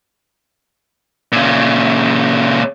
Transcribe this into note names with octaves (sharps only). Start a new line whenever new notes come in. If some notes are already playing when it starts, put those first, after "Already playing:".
A#2 C#3